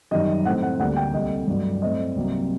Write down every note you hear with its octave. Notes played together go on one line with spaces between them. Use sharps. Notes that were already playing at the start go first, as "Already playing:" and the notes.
F#2 D#3 G3 D#5
A2 A3 C4 F#5
F#5
D2 D3 G3 A#3 F#5
G5
C2 C3 G3 D#5
G2 F#3 A3
A2 A3 C4 D#5
C2 C3 F#3 A#3